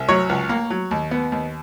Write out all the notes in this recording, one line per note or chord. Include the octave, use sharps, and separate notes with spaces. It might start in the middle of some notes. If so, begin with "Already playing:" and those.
Already playing: C2
F#3 C#5
C#2
A#3
F#3
D#2
B3
D#2